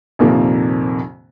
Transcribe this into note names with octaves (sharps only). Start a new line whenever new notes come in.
A#1 F2 C3 D#3 F3 A#3